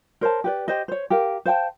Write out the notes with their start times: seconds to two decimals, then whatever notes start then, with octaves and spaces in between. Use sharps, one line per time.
0.21 A#4 C5 C#5 A5
0.44 G4 B4 D5
0.68 G4 C5 D#5
0.88 C5 C#5
1.10 G4 A#4 F5
1.46 C5 F5 G5 A5